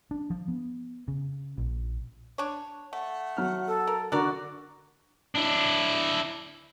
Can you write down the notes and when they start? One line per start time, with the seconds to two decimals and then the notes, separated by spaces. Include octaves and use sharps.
0.11 D4
0.30 F3
0.48 B3
1.08 C#3
1.58 A#1
2.38 D4 C#5
2.93 A3 F#5
3.37 F#3 F6
3.67 A4
3.87 A#4
4.12 D3 D4 F#4 A#4 D5
5.35 D4 E4